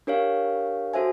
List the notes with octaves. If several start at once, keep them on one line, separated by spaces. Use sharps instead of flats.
D4 G4 A#4 C#5 F5
F#4 A4 C5 E5 G#5